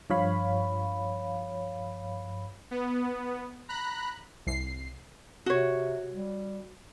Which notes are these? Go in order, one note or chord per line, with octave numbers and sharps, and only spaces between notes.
G2 F3 C#5 F5 B5
B3
A#5 B5 F#6
C2 C7
C3 F#4 C#5
G3